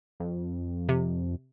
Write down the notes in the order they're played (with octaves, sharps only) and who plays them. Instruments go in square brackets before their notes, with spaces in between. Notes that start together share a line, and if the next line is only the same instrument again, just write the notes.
[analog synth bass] F2
[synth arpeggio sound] C3